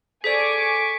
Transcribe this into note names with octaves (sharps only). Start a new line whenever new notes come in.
G#4 A4 C5 D5 G#5 C#6 D6 B6